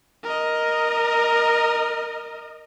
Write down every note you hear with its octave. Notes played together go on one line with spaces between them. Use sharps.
A#4 D#5